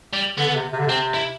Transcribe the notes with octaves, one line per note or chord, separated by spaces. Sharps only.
G3
D3 B3
D3
C3
C3
D3
C3 C4
E4